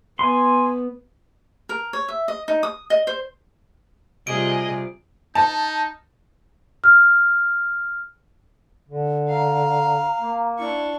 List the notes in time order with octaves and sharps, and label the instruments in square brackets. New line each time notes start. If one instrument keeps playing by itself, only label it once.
[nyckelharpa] B3 [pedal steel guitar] G#5 C6
[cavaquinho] A#4
C#5
E5
D#5
D#4
D#6
D#5
C5
[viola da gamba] C3 G3 F4 [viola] G#4 [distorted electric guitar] D#5 [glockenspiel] D7
[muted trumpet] D#4 [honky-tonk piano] A5
[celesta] F6
[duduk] D3
[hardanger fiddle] F5 [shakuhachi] A#5
[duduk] A#3
[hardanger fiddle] D4 C#6 [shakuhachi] E4